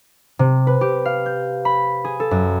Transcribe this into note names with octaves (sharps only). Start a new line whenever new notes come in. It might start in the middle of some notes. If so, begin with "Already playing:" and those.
C3
B4
G4
F5
G6
B5
G#4
A4
F#2